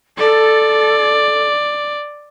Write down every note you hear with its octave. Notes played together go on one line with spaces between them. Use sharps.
A4 D5